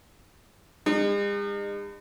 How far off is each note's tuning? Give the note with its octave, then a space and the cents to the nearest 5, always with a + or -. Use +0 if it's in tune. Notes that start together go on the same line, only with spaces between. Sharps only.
G#3 -45 D#4 -40